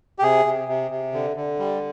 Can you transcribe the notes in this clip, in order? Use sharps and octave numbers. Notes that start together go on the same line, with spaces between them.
G4
C3 G#4
C3
C3
C3
D3
D3
G3